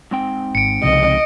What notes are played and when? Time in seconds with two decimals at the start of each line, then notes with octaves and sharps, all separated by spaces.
0.11 G#2 C4 G5
0.55 G#1 C#7 D7
0.83 C2 C#3 F3 D#5